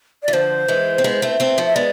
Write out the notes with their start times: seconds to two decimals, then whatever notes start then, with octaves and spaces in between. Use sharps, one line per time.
0.23 E3 D5
0.33 D3 F3 C5
0.68 E3 G#3
0.98 C4
1.04 G#3 B3
1.22 A3 C4
1.40 A3 C4
1.58 F3 A3
1.67 E5
1.75 G#3 B3 D5